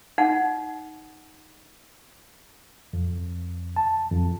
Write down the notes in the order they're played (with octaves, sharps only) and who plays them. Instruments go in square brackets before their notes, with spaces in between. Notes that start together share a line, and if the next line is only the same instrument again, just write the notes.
[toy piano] D#4 F#5
[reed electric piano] F2
A5
F2